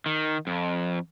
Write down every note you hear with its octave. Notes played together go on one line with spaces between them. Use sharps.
D#3
F2